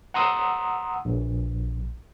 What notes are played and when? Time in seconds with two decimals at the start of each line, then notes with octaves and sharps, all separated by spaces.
0.14 F#5 A#5 C6 D#6 E6
1.05 A#1